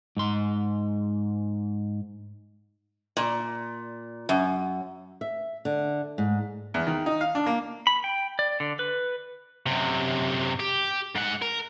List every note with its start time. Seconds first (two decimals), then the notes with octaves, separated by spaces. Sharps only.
0.17 G#2 C6
3.17 A#2
4.29 F#2
5.21 E5
5.65 D3
6.18 G#2
6.74 E2
6.87 D#3
7.06 D#4
7.21 F5
7.35 D4
7.46 A#3
7.87 B5
8.04 G5
8.39 D5
8.60 D3
8.79 B4
9.66 F#2 C3
10.60 G4
11.15 G#2 F#5
11.42 A#4